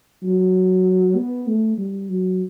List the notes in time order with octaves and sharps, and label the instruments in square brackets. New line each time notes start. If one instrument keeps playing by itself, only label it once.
[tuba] F#3
B3
A3
G3
F#3